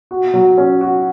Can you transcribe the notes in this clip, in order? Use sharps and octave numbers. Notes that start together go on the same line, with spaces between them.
F#4
F#3
C#4
F#4